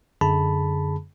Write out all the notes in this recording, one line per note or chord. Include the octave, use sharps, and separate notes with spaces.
F#2 D3 G#4 A5 B5